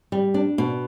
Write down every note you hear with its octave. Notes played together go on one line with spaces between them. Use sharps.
G3
D4
B2